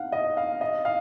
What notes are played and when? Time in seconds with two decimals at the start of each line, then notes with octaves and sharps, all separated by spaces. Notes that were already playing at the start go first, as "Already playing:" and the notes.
Already playing: F5 F#5
0.12 D#5
0.37 F5
0.61 D#5
0.85 F5